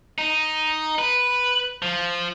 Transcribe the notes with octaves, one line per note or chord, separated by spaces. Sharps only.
D#4
B4
F3